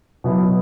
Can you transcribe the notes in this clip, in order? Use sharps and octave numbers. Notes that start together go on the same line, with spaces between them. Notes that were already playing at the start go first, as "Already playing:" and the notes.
B2 F#3 B3 E4